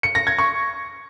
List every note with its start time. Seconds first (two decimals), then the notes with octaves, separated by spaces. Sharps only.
0.03 C#7
0.15 A#6
0.27 G#6
0.39 C#6